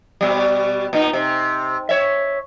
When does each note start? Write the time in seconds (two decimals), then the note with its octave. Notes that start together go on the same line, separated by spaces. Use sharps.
0.21 B2 G3
0.93 A#2 D#4
1.13 C3
1.89 C#5 E5